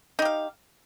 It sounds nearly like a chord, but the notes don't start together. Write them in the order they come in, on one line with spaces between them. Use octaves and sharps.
D#4 G4 F5